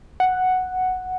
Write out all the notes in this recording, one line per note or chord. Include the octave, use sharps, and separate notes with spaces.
F#5